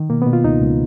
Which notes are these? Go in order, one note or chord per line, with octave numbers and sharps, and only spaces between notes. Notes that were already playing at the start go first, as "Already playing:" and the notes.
Already playing: D#3
B2 A#3
B3
B2
F4
C#2 D#4
C#2